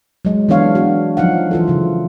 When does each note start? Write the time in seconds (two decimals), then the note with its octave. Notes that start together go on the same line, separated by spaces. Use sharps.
0.25 F#3 G#3
0.49 E3 B3 D4 C#5 F5
0.75 B3 D4 F#4
1.17 F3 F#3 D#4 F5 F#5
1.51 E3 F4 A4
1.68 C#3 F3